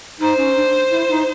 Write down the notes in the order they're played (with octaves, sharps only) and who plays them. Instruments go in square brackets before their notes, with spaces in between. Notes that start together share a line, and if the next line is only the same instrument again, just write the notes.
[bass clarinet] D#4 [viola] C5
[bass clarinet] C#4
D4
E4
D#4